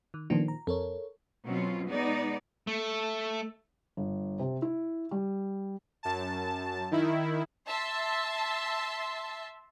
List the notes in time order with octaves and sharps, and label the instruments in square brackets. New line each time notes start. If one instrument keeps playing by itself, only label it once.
[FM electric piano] D#3
[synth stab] A#2 D#3 F3 [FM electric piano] A3 B3 D4
[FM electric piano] A#5
[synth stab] F2 [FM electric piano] A4 A#4 C#5
[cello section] B2 F#3 C4 C#4 F4
G#3 B3 D#4 D5
[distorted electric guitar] A3
[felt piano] G1
C3
E4
G3
[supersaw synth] F#2 A5
D#3 E4
[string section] E5 A5 C6